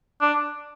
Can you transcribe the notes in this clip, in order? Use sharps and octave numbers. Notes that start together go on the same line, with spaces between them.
D4